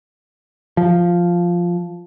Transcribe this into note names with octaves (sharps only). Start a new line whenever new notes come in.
F3